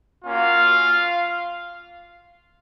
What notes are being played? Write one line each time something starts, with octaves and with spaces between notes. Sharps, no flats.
A#3 C#4 F4 F#4 F5